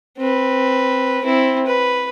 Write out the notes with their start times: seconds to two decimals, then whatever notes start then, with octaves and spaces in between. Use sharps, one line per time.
0.18 C4 B4
1.23 C4 E4
1.66 B4